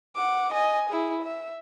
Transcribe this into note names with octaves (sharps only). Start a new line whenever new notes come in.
F#5 D6
D#5 G#5
E4 G#4
E5